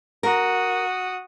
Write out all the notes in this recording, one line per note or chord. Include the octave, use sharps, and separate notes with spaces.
F#4 A#4 D#6